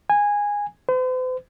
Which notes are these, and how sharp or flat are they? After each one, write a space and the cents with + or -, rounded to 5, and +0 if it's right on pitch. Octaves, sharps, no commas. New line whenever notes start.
G#5 -15
C5 -45